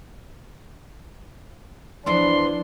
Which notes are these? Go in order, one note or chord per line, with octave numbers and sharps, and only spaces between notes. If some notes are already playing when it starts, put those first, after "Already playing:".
E2 E3 F3 D4 E4 C6